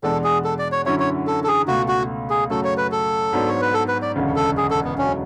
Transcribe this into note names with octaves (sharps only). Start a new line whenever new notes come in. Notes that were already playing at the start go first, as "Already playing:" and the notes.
E2 B2 G#3 D4 A4
G#4
A4
D5
C#5
F#2 D3 F#3 C#4 E4 C#5
C#5
A4
A4
G#4
C#2 B2 A3 F#4
F#4
G#4
F#2 C#3 F#3 A3 A4
C#5
B4
A4
G#2 F#3 B3 D4
C#5
B4
A4
B4
D5
E1 D2 C#3
A4
G#4
A4
B3
E1 D2 C#3 F#3 C#4